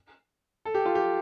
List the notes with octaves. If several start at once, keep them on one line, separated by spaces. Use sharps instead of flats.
A4
G4
F4
G4